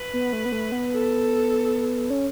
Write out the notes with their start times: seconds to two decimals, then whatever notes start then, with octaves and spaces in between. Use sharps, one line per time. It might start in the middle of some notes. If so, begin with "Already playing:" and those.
Already playing: B4
0.13 B3
0.33 A3
0.45 B3
0.52 A3
0.72 B3
0.92 A4
2.10 C#4